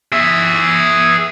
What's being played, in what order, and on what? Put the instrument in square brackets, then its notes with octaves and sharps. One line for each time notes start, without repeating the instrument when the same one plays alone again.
[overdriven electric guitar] G#4 E5